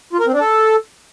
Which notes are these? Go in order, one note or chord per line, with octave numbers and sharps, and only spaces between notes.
F4
A#4
C4
D4
A4